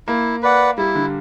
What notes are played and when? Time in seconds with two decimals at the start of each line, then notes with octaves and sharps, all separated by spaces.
0.08 A#3 E4
0.43 B4 D5 F#5
0.78 G3 E4
0.95 D3